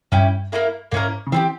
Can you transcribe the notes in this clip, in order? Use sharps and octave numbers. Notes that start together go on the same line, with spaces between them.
G2 C#4 E4 G4
A#3 C#4 E4 A#4
G#2 A#3 C#4 E4 A#4
C#3
E3 C4 E4 G4